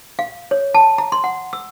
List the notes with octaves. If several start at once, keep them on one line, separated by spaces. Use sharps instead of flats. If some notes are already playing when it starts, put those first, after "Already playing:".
F5
C#5
A5
A#5
C6
F#5
E6